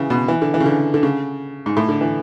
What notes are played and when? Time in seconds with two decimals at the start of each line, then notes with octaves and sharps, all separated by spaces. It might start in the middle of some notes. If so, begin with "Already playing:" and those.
Already playing: C#3 E3
0.10 B2
0.28 E3
0.42 D3
0.54 E3
0.60 C#3
0.66 D3
0.94 D3
1.03 C#3
1.66 G#2
1.77 A2
1.89 D3
2.01 E3